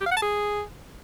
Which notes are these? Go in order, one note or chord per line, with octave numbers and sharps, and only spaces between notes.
G4
F5
F#5
A5
G#4